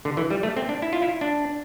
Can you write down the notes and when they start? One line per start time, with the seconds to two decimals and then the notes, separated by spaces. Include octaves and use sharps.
0.05 D3
0.17 E3
0.31 G3
0.43 A3
0.57 C4
0.69 D4
0.82 E4
0.93 F4
1.02 E4
1.21 D4